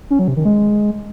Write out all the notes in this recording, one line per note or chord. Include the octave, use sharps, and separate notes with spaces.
C#4
F#3
C3
D#3
G#3